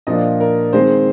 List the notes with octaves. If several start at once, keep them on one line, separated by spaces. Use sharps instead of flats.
A#2 F3 A#3 D4 D#5
A#4
D#3 G#3 C4 C5